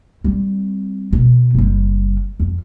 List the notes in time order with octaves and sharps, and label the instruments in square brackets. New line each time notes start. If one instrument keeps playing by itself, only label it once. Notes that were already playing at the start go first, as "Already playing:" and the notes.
[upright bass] G3 C4
B2
F#1 G3
F2